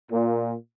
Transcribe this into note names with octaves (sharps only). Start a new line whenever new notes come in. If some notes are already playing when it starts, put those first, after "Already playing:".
A#2